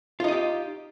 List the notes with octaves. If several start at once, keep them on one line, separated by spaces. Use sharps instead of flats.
D#4 F4 G4 D#5